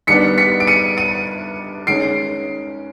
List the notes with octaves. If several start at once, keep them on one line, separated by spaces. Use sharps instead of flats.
D#3 G3 B3 D4 B6 C#7
B6 C#7
D7
C#7 D#7
C#7 D#7
D#3 G#3 C#4 C7 D7